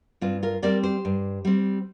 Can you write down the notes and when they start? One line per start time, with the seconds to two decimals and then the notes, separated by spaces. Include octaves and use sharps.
0.21 G2 C4 F4
0.43 F4 A#4
0.62 G3 C4 A#4 D5
0.83 G4 C5
1.05 G2
1.45 G3 C4